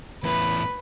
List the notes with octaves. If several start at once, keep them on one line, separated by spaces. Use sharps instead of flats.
E2 A2 B4